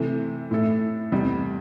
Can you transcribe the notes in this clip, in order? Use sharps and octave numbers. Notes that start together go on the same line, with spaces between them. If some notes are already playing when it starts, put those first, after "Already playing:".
Already playing: C3 E3 A3
A2 A3 E4 A4
E2 C3 G3